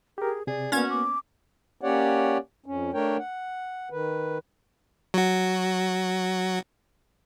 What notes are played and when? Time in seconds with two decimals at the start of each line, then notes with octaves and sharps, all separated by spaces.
0.18 G4 G#4 A#4
0.47 C3 G#4 D5
0.72 A#3 B3 C#4 F#4 G#6
0.90 D6
1.81 A#3 C#4 G4 C#5 D5 F#5
2.66 F2 C#4
2.94 A3 D4 A#4 C#5 G5
3.18 F#5
3.91 D#3 B4
5.14 F#3 F#4